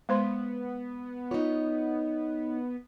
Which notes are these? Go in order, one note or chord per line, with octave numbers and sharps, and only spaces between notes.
G#3 B3 C5 C6
D#4 F4 C#5